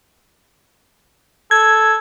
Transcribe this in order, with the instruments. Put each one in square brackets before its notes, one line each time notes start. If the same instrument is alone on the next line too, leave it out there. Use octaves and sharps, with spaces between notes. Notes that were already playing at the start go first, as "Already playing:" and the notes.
[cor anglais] A4 [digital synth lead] G#6